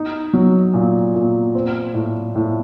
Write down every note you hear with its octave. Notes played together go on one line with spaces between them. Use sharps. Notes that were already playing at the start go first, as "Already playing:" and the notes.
Already playing: D#4
F#3
A#2
A#2
C4
A2
A2